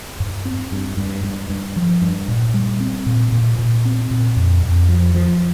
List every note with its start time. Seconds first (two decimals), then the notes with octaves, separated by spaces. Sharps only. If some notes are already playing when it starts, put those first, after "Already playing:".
0.20 G2
0.45 C4
0.72 G2
0.97 G2
1.24 G2
1.49 G2
1.76 F3
2.02 G2
2.28 A#2
2.54 G3
2.80 C4
3.06 A#2
3.32 A#2
3.59 A#2
3.85 C4
4.11 A#2
4.36 F2
4.63 F2
4.89 F3
5.15 F3